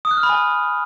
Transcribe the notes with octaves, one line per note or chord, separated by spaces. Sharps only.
D#6
F#6
F6
B5
G#5